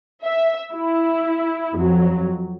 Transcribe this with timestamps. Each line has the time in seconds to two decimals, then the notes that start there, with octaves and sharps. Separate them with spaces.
0.24 E5
0.74 E4
1.75 F2 F#3